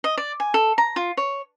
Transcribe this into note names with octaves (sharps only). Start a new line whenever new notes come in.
D#5
D5
G#5
A4
A#5
F4
C#5